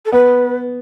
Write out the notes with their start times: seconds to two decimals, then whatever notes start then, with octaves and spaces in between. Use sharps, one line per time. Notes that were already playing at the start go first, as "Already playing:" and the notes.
0.06 A4
0.12 B3 B4